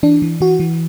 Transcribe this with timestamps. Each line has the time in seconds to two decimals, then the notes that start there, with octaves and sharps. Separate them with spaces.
0.03 E3 D4
0.22 E3
0.41 E3 F#4
0.60 E3